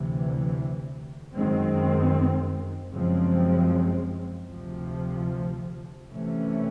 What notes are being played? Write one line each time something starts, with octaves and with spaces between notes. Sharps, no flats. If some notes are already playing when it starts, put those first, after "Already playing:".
Already playing: D2 C3 E3
F#2 D#3 G#3 C4
F#2 C#3 F3 G#3 C4
D2 C3 F3
C3 E3 A3 C#4